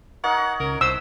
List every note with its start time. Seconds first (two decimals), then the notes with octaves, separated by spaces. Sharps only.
0.24 D#4 A#4 C#5 F#5
0.37 A#5
0.60 C#2 A#4
0.81 C2 C5 F#5 E6